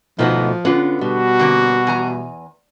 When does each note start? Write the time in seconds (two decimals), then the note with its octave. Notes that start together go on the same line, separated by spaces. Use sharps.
0.19 D2 G#2 B2 F3 A3 B3 D#4
0.65 D3 B3 C#4 F4 B4
1.01 B2 G3 F#4
1.39 D3 A#3 C#4
1.87 E2 G#5 A#5